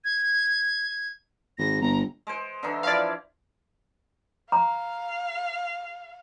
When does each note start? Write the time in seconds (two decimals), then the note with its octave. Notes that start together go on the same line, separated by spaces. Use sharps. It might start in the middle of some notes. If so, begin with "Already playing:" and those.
0.04 G#6
1.58 G#1 A#6
1.81 G1 A#5
2.27 G#3 C5
2.63 D3 E3 D#4
2.83 F3 E4 D5 F5
4.52 F5 A#5